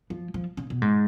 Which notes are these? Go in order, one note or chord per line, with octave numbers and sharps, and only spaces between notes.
F3
F3
C#3
B2
G#2